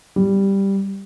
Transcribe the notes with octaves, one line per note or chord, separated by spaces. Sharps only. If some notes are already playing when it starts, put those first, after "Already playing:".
G3